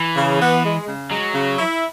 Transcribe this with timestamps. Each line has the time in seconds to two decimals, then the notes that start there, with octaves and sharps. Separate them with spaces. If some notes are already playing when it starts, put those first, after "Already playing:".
Already playing: E3
0.15 C#3
0.40 B3
0.64 G#3
0.88 C#3
1.11 F#3 G#3
1.34 C#3
1.59 E4